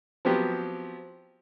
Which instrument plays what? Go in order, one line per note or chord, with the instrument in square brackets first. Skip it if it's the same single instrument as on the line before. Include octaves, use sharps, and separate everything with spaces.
[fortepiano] F3 F#3 B3 C4 G4